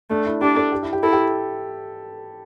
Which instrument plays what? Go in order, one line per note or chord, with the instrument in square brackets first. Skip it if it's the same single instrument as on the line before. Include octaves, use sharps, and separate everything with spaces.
[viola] A3 [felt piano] D4
[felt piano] E4
[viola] D4 [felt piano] G4
[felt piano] A4
G4
E4
G4
[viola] E4 [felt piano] A4
[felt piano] G4